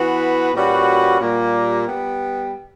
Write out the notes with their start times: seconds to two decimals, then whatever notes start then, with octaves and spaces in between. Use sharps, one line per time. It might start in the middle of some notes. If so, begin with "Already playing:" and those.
Already playing: E3 B3 F#4 B4
0.54 A#2 G3 C#4 F#4 B4
1.20 A#2 G3 A#3
1.86 G3 B3